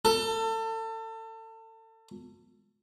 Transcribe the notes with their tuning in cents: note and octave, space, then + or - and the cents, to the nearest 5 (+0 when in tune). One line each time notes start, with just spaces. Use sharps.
A4 +30